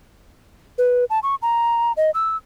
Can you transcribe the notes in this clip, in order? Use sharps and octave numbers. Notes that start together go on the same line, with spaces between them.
B4
A5
C#6
A#5
D#5
E6